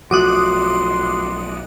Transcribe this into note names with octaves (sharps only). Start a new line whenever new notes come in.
B1 F3 A3 F#4 C6 D6 D#6 F#6